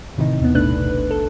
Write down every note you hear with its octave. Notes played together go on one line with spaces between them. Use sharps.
A2 C3 D#3 E3 D#4
D#2 B2 B3
A1 D#2 A3 D4 B4 F#6
A4